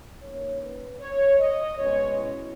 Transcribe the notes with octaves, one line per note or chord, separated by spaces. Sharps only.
D#3 A#3 C#4 C#5
B4
C#5
D#5
B2 G#3 C#4 C#5
E4